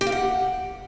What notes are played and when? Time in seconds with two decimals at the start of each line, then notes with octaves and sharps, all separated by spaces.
0.01 G4
0.07 F5
0.12 F#5